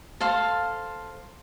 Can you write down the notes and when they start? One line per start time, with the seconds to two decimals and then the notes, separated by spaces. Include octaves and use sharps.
0.20 A4 C5 F5 C6